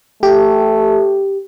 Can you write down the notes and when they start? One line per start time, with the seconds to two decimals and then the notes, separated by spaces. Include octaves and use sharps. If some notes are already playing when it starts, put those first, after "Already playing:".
0.23 A3 G4